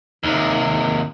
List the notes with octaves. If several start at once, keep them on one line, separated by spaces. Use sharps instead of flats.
D#2 C3 D#4